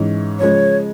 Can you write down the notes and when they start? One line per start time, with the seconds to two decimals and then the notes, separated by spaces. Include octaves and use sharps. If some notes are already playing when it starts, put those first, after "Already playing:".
Already playing: G#2 E3 G#3 C#4
0.39 C#3 F3 G#3 C#5